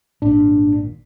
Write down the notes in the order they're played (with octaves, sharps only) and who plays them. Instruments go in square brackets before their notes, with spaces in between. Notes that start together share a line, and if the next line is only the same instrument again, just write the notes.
[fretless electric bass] G#1 A#2 [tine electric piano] D4